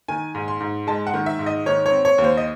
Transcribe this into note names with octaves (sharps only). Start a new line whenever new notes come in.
D#3 G#5
G#2
C6
G#2
G#3 A5
F#5
D#3
E5
G#2
D#5
D#3 C#5
C#5
C4
C#5
D#2
C5
D#5